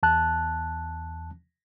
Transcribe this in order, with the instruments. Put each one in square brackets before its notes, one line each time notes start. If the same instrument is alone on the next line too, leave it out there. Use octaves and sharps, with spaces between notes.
[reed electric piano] E2 A5 F#6